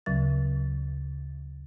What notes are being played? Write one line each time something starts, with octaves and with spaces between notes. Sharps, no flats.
D2 C#3 F#3 A6